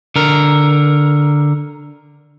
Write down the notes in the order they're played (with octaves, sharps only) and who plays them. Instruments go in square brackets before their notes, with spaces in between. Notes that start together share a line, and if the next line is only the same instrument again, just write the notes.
[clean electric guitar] D3 A#4